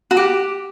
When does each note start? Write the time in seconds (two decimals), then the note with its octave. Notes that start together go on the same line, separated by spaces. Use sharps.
0.11 F#4
0.17 G4